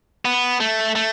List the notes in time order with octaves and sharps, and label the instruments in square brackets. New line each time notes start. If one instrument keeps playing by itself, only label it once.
[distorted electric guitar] B3
A3
A3